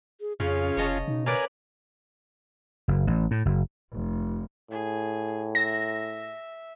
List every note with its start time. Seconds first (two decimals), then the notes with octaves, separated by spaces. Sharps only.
0.21 G#4
0.40 F2 C#3 C#4 F4 G#4
0.77 F1 C#5 D#5 A5
1.08 B2 D#4
1.26 A#4 B4 C#5 D5 F5 G#5
2.88 F#1
3.07 A1
3.31 A2
3.45 F#1
3.93 F1
4.71 A2 G#4
5.55 E5 A#6